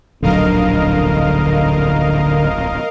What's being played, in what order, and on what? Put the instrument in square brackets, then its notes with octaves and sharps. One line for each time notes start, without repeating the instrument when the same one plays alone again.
[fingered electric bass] D1 A#1 F#3 [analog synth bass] D3 [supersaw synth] A#4 D#5 F5